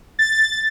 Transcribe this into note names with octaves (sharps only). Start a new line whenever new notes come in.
A6